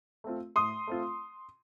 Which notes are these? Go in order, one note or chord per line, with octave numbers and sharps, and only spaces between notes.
A3 C4 F4
A2 C6 D#6
A3 C4 F4